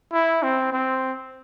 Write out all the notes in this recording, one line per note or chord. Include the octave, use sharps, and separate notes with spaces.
E4
C4
C4